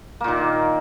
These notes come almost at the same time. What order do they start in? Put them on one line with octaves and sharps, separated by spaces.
A#3 A#2 D#3